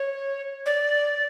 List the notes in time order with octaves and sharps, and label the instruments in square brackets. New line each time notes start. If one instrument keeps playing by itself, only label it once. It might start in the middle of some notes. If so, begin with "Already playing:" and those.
Already playing: [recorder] C#5
D5